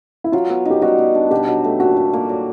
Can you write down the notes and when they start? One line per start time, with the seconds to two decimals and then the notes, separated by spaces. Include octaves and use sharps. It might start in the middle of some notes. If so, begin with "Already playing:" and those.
0.24 E4
0.32 F#3 F4
0.49 B3
0.65 D#4 G4
0.82 G3 F#4
0.98 B3
1.15 D4
1.31 B2 G4
1.48 F#3
1.64 A3
1.80 A#2 F#4
1.97 G3
2.13 A#3
2.29 F#3